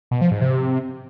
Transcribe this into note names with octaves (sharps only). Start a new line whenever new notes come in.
B2
F3
G#2
C3